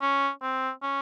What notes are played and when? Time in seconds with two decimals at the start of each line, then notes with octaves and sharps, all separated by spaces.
0.01 C#4
0.42 C4
0.82 C#4